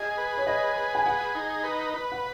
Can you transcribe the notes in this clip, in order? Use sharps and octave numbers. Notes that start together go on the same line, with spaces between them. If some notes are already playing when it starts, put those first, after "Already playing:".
Already playing: G#4 D#5
B4
C#5
G#4 D#5
B4
G#5
G#4 F#5
D#4
B4
B4
F#5